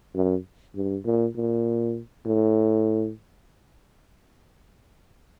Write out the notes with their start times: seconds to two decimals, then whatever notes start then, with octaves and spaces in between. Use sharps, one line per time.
0.15 F#2
0.75 G2
1.05 A#2
1.36 A#2
2.26 A2